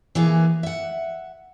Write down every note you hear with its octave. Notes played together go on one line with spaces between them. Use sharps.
E3 A#3 B3 G#4
E5 F#5